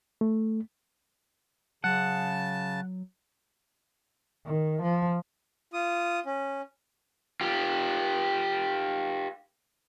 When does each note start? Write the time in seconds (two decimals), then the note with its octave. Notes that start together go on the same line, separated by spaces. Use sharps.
0.21 A3
1.84 C#3 F#3 F#5 A5
4.46 D#3
4.82 F3
5.73 F4 D#6
6.26 C#4
7.41 F4 G4